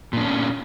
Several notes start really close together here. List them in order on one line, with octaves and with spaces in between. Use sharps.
A#2 D4 C#4